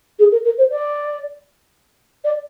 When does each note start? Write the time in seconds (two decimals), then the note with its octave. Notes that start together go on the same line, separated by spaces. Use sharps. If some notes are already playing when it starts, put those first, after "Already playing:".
0.19 G#4
0.32 A#4
0.45 A#4
0.58 C5
0.71 D5
2.24 D5